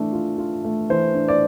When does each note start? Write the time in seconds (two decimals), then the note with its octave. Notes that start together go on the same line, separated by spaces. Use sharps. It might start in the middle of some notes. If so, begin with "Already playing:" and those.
Already playing: E3 A3 D4
0.13 F4
0.38 F4
0.65 A3
0.90 E3 C5
1.15 D4
1.28 D5